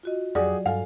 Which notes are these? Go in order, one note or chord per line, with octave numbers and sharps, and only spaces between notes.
F4 F#4 D#5
F2 F#3 G4 G#4 D5 F#5
G2 A4 F5 G#5